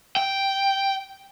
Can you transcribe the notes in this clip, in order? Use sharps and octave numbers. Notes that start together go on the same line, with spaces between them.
G5